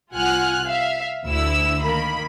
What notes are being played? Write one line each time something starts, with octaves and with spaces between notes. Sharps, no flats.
C2 F4 F#5 G#5 F6 F#6
E5 F5
D2 D3 E4 E6
D#3 A#3 B5